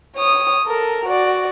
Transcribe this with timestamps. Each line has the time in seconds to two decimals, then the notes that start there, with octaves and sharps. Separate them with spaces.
0.15 C#5 D#6
0.66 A4 A#4
1.05 F#4 D5